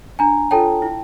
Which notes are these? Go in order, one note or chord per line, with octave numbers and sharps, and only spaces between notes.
D4 G#5 A#5
F4 A4 C#5 G5 A5
E4